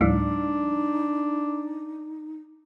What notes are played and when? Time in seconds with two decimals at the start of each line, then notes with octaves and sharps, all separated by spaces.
0.01 D2 A2 F3 G3 A3 D4 D#4